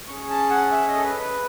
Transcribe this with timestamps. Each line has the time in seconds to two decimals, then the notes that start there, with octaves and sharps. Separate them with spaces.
0.08 C#4 G#4 C#6
0.30 A5
0.50 F#5
0.71 E5
0.88 D#5
0.97 A4
1.04 B4
1.20 B4